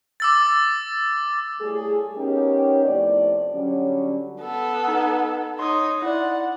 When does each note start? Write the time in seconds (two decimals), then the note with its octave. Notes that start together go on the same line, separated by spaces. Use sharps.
0.20 D6 E6 A6
1.61 A2 G3 A3 G#4
2.16 B3 C#4 D#4 G4 A#4 C#5
2.85 A2 C3 F3 D5
3.54 D3 F#3 G3 C#4
4.42 B3 A4
4.88 D#4
5.59 D#4 C#5 C6 D#6
6.02 E4 D5 F#5